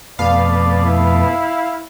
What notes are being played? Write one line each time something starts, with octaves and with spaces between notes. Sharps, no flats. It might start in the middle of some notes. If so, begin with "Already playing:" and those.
F2 B2 A3 B3 D5 F5
E4